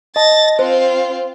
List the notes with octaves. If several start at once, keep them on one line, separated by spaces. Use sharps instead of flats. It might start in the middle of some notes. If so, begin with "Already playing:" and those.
D#5 A5 A6 A#6
C4 F4 C5